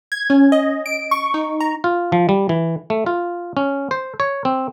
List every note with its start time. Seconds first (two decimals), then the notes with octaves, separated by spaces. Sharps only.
0.12 G#6
0.30 C#4
0.52 D#5
0.86 D7
1.11 C#6
1.34 D#4
1.60 A#5
1.84 F4
2.12 F3
2.29 G3
2.49 E3
2.90 A3
3.06 F4
3.57 C#4
3.91 C5
4.20 C#5
4.45 C4